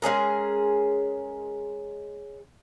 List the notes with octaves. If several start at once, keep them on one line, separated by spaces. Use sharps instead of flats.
G#3 C#4 G#4 A#4